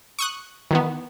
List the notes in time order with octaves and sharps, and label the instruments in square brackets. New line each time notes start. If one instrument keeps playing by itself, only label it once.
[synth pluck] C#6 D#6 F#6
D#3 E3 B3